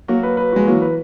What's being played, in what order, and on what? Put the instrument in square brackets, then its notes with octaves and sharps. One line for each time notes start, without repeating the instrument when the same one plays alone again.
[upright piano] F#3 A#3 [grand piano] F#4
[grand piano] B4
B4
[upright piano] G#3 [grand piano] F#4
[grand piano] E3 [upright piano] F#3 A#3
[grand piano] B4